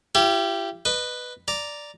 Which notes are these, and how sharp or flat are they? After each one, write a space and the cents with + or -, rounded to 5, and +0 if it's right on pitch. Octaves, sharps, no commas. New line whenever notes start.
E4 +45 G4 -5
B4 +0 D#5 -30
D5 +0 A#5 +0